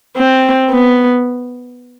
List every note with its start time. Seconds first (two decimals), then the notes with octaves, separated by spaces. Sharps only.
0.17 C4
0.70 B3